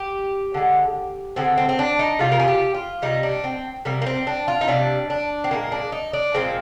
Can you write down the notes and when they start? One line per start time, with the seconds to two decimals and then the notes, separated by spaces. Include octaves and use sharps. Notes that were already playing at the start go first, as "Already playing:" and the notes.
Already playing: G4
0.54 D3 G#3
1.36 D3 G#3 C4
1.58 C4
1.69 C4
1.79 D4
1.99 D#4
2.19 C3 G3 F4
2.32 A#4
2.40 G#4
2.48 G4
2.74 F4
3.02 C3 G3 D#4
3.23 D4
3.44 C4
3.85 C3 G3 A#3
4.02 A#3
4.06 C4
4.27 D4
4.48 F4
4.61 D#4
4.68 C3 G3 D4
5.10 D4
5.44 C4
5.51 A#2 F3 G#3 A#3
5.72 D4
5.92 D#4
6.13 D4
6.34 A#2 F3 G#3 C4